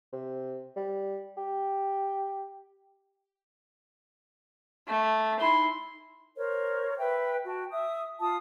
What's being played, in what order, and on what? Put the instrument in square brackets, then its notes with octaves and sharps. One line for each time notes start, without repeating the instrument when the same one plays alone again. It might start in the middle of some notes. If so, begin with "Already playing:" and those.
[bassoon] C3
G3
G4
[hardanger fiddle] A3
[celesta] D#4 B5 G7 [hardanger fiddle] E4 C6
[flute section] A#4 C5 C#5
B4 E5 G5
F#4 G5 A5
E5 D#6
F4 A5 D#6